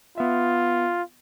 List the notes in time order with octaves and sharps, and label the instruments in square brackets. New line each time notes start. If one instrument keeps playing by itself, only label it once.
[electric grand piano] B3 E5 [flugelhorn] F4